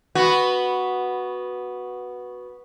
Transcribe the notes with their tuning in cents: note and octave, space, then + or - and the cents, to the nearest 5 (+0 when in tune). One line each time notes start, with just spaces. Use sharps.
B3 -5 F#4 +0